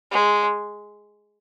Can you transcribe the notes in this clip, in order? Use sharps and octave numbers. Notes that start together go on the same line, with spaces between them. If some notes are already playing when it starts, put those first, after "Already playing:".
G#3